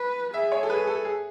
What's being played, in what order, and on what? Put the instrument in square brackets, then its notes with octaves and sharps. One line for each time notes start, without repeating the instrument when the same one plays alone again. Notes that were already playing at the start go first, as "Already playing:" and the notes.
Already playing: [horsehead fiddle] B4
[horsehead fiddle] G#4 [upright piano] E5
[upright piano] C#5
A4
B4
A4
G#4